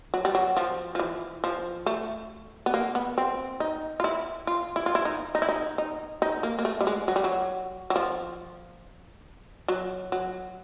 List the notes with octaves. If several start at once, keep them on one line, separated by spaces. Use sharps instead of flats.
F#3
G3
F#3
F3
F3
E3
F3
A3
B3
A#3
B3
C4
D#4
F4
E4
F4
E4
F4
E4
D#4
D#4
E4
D#4
D#4
D#4
A#3
A#3
A3
G3
G#3
F#3
G3
F#3
F#3
F3
F#3
F#3